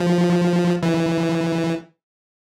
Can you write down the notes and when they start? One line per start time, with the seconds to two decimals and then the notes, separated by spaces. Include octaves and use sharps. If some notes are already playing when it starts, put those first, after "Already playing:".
Already playing: F3
0.83 E3